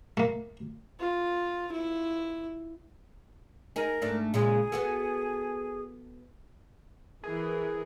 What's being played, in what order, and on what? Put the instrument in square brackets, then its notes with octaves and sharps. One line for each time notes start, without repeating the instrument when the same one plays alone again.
[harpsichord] A3 A#3
[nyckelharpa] F4
E4
[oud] D#4 G#4 [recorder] A#4
[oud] G#2 A3 D4
[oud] A#2 C#3 G#3 [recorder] G#4
[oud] B3 F#4 A4
[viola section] E3 A#4 [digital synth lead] G#4